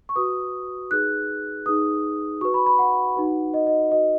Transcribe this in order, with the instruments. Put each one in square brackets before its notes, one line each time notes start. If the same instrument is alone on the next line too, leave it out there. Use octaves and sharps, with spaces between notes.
[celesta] C#6
F#4 B4 D#6
D#4 G#4 B4 F#6
D#4 G#4 B4 D#6
F#4 B4 C#6
B5
B5
F#5
D#4 F#4 B4
D#5
D#5
D#4 F#4 B4 D#5